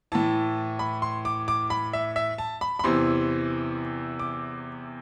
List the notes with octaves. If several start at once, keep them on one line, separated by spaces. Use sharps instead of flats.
A2 E3 A5
B5
C6
D6
D6
B5
E5
E5
A5
B5
B5
E2 C3 E3 C6
D6